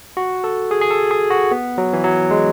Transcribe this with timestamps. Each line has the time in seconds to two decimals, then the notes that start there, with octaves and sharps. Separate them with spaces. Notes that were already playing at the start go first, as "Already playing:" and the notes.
0.17 F#4
0.44 A4
0.71 G#4
0.81 G#4
0.91 A4
1.11 G#4
1.30 F#4
1.51 B3
1.78 F#3
1.93 E3
2.04 F#3
2.31 G#3